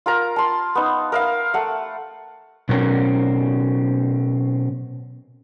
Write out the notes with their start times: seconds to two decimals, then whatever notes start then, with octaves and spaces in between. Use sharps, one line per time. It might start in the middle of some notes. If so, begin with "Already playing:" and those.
0.06 F4 A#4 A#5
0.36 A5 C6
0.75 B3 D#4
1.12 A#4 E5 F5
1.54 A3 F#5
2.69 B2 F#3 C4 C#4 A#4